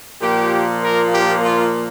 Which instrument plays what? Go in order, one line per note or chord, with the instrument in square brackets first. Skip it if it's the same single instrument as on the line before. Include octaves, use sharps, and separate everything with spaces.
[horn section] A#2 F3 A#3 G4
A#4
G4
F4